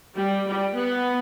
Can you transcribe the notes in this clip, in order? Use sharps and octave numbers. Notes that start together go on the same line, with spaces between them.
G3
G3
B3